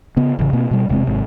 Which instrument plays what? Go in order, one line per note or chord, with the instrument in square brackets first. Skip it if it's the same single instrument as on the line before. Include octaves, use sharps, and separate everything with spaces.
[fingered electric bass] C#3 B3
A1 C#3
B2 A#3 C4
B2 G3
E1 C3 G#3 C4
G#1 G#2 C3